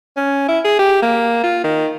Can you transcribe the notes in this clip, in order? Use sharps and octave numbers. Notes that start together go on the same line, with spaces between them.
C#4
E4
G#4
G4
A#3
F4
D#3